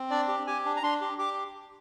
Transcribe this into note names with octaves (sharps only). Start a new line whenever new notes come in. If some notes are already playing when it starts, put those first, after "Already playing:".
Already playing: C4
D4 D5
G4
G4 G#5
D4
A#5
D4 C6
G4
G4 D6